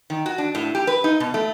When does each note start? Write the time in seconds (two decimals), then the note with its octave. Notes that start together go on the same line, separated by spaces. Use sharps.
0.10 D#3
0.26 F#4
0.38 D4
0.55 A2
0.75 G4
0.87 B4
1.04 D#4
1.20 B2
1.34 A3